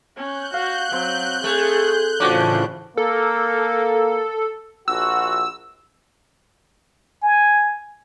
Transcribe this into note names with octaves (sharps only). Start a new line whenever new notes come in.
C#4 F#6 G6
F#4 F5
F#3 C4
A3 G#4
A2 C#3 E3 F3 C#4 D4 F#4 D6
A#3 A4
A#1 F#4 E6
G#5